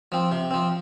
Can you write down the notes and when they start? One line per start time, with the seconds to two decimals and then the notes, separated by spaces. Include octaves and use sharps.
0.12 F3 C4
0.32 C3
0.51 F3 C4